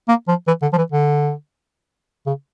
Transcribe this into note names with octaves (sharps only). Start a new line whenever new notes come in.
A#3
F3
E3
D3
F3
E3
D3
C#3